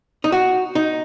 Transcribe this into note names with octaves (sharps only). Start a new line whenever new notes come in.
D#4
F#4
D#4